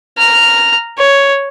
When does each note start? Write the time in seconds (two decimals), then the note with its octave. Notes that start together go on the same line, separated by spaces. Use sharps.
0.18 A#5 F6
0.98 C#5